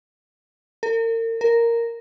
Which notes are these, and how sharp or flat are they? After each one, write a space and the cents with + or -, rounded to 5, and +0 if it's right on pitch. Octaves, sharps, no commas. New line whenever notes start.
A#4 -40
A#4 -5